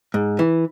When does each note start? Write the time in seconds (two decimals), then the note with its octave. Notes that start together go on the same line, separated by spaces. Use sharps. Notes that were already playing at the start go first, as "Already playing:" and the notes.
0.14 G#2
0.39 E3